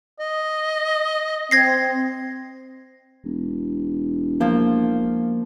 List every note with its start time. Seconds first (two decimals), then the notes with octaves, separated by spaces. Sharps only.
0.20 D#5
1.51 C4 G#6 A#6 C7
3.25 E1
4.40 F3 A#3